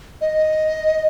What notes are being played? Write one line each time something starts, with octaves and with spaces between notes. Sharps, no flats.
D#5